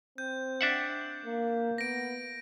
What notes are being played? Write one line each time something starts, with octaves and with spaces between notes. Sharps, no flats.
C4 G6
D4 E5 F#5
A#3
B3 A#6 D7